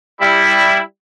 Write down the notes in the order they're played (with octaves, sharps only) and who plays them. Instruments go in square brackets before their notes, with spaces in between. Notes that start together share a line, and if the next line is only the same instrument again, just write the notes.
[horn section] G3 E4